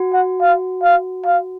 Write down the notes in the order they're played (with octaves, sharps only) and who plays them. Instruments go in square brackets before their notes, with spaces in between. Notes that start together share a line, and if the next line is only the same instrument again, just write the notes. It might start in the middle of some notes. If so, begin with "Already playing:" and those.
Already playing: [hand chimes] F#4
[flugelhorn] F#5
F5
F5
F5